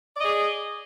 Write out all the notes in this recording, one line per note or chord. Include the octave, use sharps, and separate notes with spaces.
G#4 D5 D#5